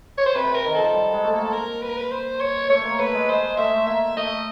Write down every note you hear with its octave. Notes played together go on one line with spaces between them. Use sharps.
C#5
C5
C3 B4
A#4
D#3
F3 A4
G3
G#3
A3
A#3
A#4
B4
A#4
B4
C5
C#5
A3 C#5
A#3
A3 B4
G#3
G#3 C5
A3 E5
A#3 E5
A3 D#5